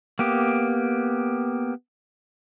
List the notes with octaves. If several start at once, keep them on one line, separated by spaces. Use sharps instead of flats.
A#3 B3 G4